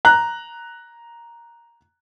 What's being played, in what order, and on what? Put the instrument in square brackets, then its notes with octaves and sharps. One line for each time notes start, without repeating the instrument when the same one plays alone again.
[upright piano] A#5 F#6